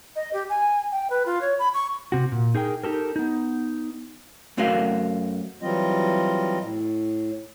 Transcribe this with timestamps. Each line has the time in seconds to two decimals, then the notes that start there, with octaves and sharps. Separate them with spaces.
0.16 D#5
0.33 G4
0.49 G#5
0.92 G5
1.10 B4
1.26 F4
1.41 C#5
1.59 B5
1.74 C#6
2.12 C3 F#4
2.32 A#2
2.55 D#4 G#4 A#4 G5
2.83 D#4 G4 A4 A#4
3.16 B3 D#4
4.57 F#2 A3 C4 F#4 A#4 F5
5.62 E3 F#3 G3 C4 F4 D#5
6.61 A2